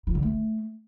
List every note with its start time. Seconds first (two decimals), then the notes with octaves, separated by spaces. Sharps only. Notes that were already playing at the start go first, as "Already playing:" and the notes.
0.07 F3
0.15 D3
0.23 A3